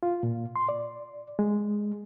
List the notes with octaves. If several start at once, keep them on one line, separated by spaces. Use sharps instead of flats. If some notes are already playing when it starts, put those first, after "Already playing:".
F4
A#2
C6
D5
G#3